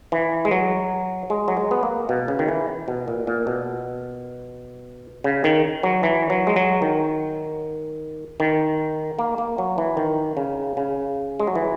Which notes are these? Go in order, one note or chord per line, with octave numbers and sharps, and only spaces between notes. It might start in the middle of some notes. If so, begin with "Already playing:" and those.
E3
G#3
F#3
G#3
F#3
G#3
B3
A#3
B2
C#3
D#3
E3
B2
A#2
A#2
B2
C#3
D#3
F#3
E3
F#3
G#3
F#3
D#3
D#3
A#3
A#3
F#3
E3
D#3
C#3
C#3
G#3
F#3
E3